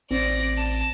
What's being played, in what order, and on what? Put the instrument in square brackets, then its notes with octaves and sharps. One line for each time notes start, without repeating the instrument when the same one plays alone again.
[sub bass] A1 [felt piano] C4 [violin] D5 A#6
[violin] A5